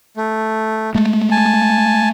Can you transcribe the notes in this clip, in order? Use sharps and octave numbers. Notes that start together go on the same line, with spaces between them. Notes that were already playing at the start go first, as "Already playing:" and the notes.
A3
G#3 A3
G#5 A5